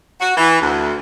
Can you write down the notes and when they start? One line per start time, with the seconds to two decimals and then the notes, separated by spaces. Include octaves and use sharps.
0.21 F#4
0.37 E3
0.61 D2